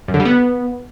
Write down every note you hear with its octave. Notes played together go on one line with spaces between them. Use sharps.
F#2
D3
G3
B3